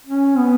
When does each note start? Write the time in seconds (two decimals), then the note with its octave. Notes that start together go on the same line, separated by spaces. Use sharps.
0.07 C#4
0.37 B3